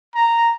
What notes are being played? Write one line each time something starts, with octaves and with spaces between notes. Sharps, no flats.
A#5